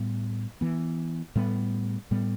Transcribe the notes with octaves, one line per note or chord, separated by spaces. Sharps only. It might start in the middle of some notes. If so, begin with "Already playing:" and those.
Already playing: A2 G3 B3
E3 B3
A2 G3 B3
A2 G3 B3